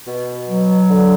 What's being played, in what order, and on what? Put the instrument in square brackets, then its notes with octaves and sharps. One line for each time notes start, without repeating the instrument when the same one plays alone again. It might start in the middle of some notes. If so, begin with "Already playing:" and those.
[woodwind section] B2
F#3
D3